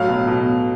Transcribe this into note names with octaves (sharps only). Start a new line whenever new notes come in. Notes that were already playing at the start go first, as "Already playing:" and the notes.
Already playing: A2 F#3 F5
B2
B2